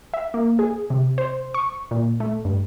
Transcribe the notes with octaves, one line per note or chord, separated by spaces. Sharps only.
E5
A#3
G#4
C3
C5
C#6
A#2
A3
G2